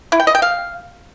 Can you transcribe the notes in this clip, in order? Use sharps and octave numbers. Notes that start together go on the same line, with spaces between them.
E4
G5
D#5
G5
F5